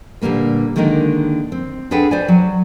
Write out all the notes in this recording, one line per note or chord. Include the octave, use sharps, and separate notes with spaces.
A#2 D3 G3 A#3 B4
D3 D#3 G#3 A#3 D#4 A#4
C4
D4 G#4 A4 B4 F#5 G5
C5 D5 G#5
F#3